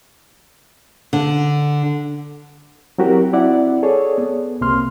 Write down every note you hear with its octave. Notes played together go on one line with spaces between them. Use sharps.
D3
F#3 C4 E4 F#4 G4 A#4
C4 E4 D5 F#5
G#4 A4 C#5 D5
B3
C#2 C3 A#3 C6 F6